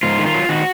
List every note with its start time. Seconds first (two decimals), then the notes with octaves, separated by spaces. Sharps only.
0.03 G#2 F4
0.18 D#3
0.26 F4
0.34 F#3
0.49 D#3 F#4